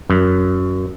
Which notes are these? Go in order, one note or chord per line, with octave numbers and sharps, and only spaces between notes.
F#2